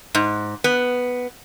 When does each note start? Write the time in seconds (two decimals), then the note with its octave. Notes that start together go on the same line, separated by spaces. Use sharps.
0.15 G#2
0.64 B3